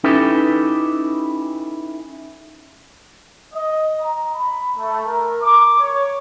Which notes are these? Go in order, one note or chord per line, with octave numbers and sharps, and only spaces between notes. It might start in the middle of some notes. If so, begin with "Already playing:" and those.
C#4 D#4 E4 G4 A4 B4
D#5
A#5
B5
A3
A#4
D6
C#5